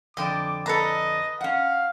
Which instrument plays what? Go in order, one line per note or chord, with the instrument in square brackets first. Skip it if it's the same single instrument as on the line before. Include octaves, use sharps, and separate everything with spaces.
[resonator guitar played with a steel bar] F2 D3 D5 [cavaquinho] D#5 G5 [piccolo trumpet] D6
[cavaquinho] A4 B4 A#5 [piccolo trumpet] D#5
[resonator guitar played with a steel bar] C#4 F#5 [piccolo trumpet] F5